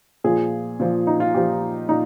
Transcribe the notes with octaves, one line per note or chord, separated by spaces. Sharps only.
A#2 F3 G#4
A#2 F3
D#4
F4
A#2 F3 G4
A#2 D#4